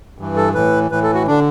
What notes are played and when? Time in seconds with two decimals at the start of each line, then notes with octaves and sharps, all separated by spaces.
0.18 G2 E3
0.36 A4
0.54 A2 E3 B4
0.91 A2 E3 B4
1.03 A4
1.14 F#4
1.27 D3 D4